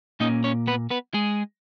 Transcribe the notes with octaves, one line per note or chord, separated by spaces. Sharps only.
A#2 A#3 C#4 D#4 D#5
C#4 C#5
B3 B4
B3 B4
G#3 G#4